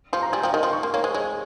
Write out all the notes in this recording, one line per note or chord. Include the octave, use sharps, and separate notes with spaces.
F3 C6
A#5
G3 G#5
F3 G5
D#3 D#5
F3 C6
C#6
A#3 C6
A#3 C#5
G#3 C5
G#3 C#5